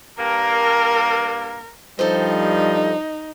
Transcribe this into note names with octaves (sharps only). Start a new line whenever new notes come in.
G2 A#3 A#4
G2 F3 G3 D#4 A4 C5